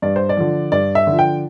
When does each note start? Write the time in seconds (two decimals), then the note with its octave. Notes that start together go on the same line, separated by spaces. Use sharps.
0.02 G2 D5
0.16 C5
0.29 D5
0.37 D3 F3
0.72 G2 D5
0.95 E5
1.07 D3 F3
1.19 G5